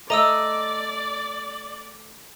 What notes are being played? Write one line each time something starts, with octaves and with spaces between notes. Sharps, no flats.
A3 D5 D#5 A#5 D#6 E6